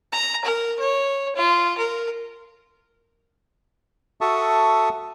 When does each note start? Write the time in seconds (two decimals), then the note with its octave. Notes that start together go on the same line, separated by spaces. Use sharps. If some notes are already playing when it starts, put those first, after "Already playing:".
0.12 A#5
0.45 A#4
0.80 C#5
1.36 F4
1.78 A#4
4.21 F#4 A4 E5 A5 C#6 D#6